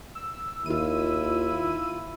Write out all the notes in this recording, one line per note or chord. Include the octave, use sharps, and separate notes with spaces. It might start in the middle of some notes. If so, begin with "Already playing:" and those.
E6
D#2 E4 F4 D#7